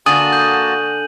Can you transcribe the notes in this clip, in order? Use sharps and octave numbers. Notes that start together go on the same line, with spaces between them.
D3 A#3 F#4 G#5 A5 D#6 D#7 F#7
G6 D#7